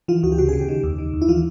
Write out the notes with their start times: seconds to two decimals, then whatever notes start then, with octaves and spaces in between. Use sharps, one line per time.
0.08 E3 F4
0.23 D2 F#4
0.32 G4
0.38 C#3 F#4
0.49 G#4
0.53 C#3
0.58 G4
0.69 D#3
0.84 D#2
0.98 D#3
1.14 D#2
1.22 E4
1.29 E3 F4